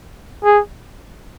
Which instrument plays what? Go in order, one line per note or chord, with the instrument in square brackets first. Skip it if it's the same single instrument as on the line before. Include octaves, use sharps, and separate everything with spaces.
[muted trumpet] G#4